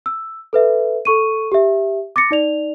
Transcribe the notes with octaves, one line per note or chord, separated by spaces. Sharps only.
E6
A4 B4 E5
A4 C#6 D#7
G4 E5
D6 A6 A#6 C#7
D#4 D5 F7